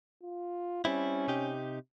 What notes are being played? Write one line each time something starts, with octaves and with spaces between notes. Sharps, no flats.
F4
G3 C4 C#4 E4
C3 D#4 G4